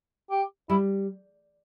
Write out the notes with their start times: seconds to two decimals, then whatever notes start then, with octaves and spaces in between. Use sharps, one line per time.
0.30 G4
0.70 G3 E4